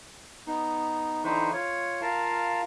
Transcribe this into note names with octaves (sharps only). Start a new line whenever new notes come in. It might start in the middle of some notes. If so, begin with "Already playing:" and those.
B3 D#4
D3 E3 D#4 B4 C5 C#6
F4 C#5
F4 A#4 F5 A5